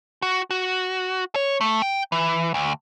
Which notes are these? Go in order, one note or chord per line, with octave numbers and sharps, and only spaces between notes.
F#4
F#4
C#5
A3
G5
E3
D2